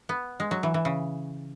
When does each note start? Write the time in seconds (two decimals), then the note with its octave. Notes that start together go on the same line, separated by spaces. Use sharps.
0.09 B3
0.40 G#3
0.51 F#3
0.63 E3
0.74 E3
0.85 C#3